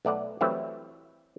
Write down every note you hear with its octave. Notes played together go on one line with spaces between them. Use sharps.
B1 A3 D5 F#5
E3 F#3 G3 A3 C4 E4